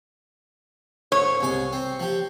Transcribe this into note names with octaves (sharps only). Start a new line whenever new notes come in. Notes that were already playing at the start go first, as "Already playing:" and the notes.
G#2 C#5
C2 G#3 G#5
C4
F3 G4